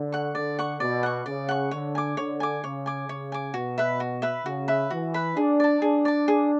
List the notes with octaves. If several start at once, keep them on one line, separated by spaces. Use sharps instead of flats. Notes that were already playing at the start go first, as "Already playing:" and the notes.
Already playing: D3
F#5 C#6
D3 D5
F#5 C#6
B2 D5
F#5 C#6
C#3 D5
F#5 C#6
D3 C#5
G#5 D6
D3 C#5
G#5 D6
C#3 C#5
G#5 D6
C#3 C#5
G#5 D6
B2 F#4
B4 E5 B5
F#4
B4 E5 B5
C#3 F#4
B4 E5 B5
E3 F#4
B4 E5 B5
D4 G#4
D5 A5
D4 G#4
D5 A5
G#4